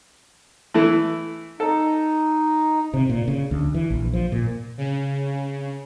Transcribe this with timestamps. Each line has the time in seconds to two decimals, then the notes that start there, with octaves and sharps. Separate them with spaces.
0.74 E3 A3
1.60 D#4 A4
2.94 C3
3.09 A#2
3.28 C#3
3.51 D2
3.74 E3
3.90 A#1
4.13 F3
4.32 A#2
4.78 C#3